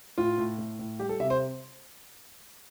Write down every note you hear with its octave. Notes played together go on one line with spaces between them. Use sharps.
A2 F4
A2
A2
A2
G3 G4
A4
C3 E5
C5